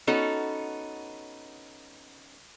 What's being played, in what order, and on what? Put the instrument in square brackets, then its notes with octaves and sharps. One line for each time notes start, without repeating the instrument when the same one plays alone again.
[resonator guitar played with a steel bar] B3 C#4 D#4 F#4 A4